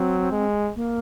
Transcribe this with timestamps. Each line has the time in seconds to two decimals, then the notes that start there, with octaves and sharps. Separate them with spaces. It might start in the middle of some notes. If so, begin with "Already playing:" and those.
Already playing: F#3 C4
0.31 G#3
0.75 A#3